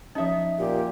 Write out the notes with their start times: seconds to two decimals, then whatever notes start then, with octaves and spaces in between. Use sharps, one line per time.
0.15 F3 C#4 D#4 E5
0.59 A#2 G4